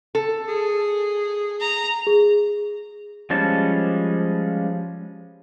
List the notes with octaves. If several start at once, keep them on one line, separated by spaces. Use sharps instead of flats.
A4
G#4
A#5
G#4
F3 G3 G#3 C#4 A5